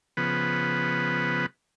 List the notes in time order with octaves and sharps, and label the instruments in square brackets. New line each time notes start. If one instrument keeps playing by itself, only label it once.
[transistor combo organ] C#3 F3 B3 B4